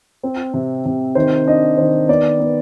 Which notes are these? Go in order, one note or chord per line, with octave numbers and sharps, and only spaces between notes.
C4
C3
C3
D#3 C5
D4 D#5
D#3 C5
B3 D5
B3